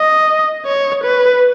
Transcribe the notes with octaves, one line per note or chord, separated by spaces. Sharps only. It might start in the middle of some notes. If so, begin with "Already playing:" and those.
Already playing: D#5
C#5
B4